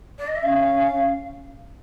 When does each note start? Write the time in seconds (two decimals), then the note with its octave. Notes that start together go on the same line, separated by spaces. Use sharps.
0.18 D5
0.27 D#5
0.36 E5
0.43 C#4 F5